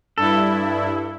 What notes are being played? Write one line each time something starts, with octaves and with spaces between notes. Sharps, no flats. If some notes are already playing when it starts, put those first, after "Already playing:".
G2 E4 A4